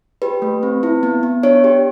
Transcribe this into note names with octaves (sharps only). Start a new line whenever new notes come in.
G4 B4
A3
C4
E4
B3
B3
D4 C#5
G4